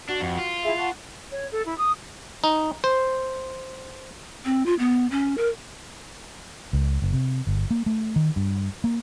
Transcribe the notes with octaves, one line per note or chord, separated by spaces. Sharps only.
D4 F#4
F2
F4
E4 G#4 E5
F#5 A5 C#6
C#5
A4
E4
D#6
D#4
C5
C4
F4
B3
C#4
A#4
C#2
F#1
C3
G1
A#3
A3
D#3
G2
A#3